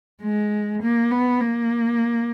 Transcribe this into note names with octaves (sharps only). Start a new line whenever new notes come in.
G#3
A#3
B3
A#3